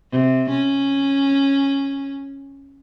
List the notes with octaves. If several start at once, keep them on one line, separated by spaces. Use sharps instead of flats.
C3
C#4